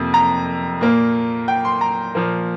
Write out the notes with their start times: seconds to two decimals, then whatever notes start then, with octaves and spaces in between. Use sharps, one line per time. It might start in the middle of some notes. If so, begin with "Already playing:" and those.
Already playing: F2 C3 A#3
0.14 A#5
0.81 A#2 A#3
1.48 G5
1.65 C6
1.81 A#5
2.15 A#2 F3 A#3